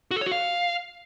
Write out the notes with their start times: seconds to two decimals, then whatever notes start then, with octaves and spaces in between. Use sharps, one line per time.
0.11 F#4
0.16 A4
0.21 C#5
0.26 F#4
0.32 F5